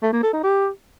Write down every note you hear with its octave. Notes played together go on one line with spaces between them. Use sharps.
A3
A#3
A4
D#4
G4